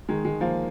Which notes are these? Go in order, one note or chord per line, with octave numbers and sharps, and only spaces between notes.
D#3 G#3
D#3 G#3
F3 A#3